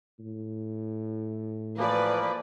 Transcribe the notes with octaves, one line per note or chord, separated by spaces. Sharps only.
A2
E3 F3 A#3 B4 D5